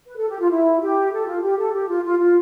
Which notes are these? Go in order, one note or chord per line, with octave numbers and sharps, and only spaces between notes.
B4
A4
G4
F4
E4
G4
A4
F4
G4
A4
G4
F4
F4
F4